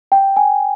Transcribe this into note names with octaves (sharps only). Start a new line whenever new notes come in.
G5
G#5